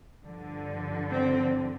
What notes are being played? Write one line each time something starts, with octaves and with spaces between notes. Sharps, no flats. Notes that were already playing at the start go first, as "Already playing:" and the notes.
G2 D3 F3
C4